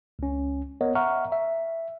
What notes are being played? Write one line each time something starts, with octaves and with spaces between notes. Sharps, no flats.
C#2 C#4
B3 A#4 C#5 D#5 F#5
E5 F#5 A#5 C#6 F6
E5